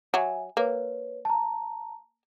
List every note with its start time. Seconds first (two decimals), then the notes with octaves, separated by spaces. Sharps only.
0.14 F#3 E5 G#5
0.57 A#3 B4 C#5
1.25 A5 A#5